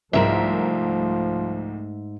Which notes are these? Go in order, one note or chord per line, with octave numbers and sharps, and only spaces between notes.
C2 G#2 D#3 F3 A3 A#4 E5